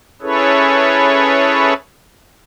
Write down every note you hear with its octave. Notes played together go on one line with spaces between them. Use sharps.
C#4 E4 G#4 A4 B4 C#5